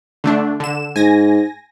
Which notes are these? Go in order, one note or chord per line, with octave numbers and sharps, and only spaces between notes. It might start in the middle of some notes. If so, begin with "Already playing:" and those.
D3 A3 D4
D3 E7
G#2 G#5 A#6